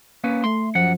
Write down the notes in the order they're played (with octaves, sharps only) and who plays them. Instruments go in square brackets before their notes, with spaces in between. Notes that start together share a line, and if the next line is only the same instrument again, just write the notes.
[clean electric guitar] A#3 C#4 B4
[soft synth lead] A3 [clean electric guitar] C6
[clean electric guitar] F#2 F#5 [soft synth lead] F3